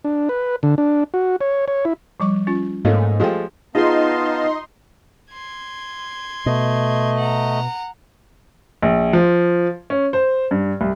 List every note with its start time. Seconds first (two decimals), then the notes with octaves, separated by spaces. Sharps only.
0.05 D4
0.29 B4
0.63 D3
0.78 D4
1.14 F#4
1.41 C#5
1.68 C#5
1.85 E4
2.20 F3 G3 C#6
2.47 C#4 F4
2.85 G#2 A3 A#3 D#4 C#5
3.20 F3 G#3 A3 G4 G5
3.75 B3 D#4 F4 G#4 D#5 F5 A5 C6
5.32 C6 G#6
6.46 B2 A3 D#5
7.17 F#5 A#5
8.83 A#1
9.13 F3
9.90 C#4
10.13 C5
10.51 G2
10.81 C2